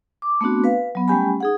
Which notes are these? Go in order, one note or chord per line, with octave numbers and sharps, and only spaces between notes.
D6
A3 B3 C4 D4 F#4
B4 F5
F#3 B3
G3 A3 C#4 G4 G#5 B5
D#4 G#4 F#5